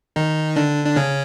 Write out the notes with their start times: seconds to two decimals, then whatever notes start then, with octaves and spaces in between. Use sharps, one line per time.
0.16 D#3 D#4
0.56 D3 D4
0.85 D4
0.96 C#3 C#4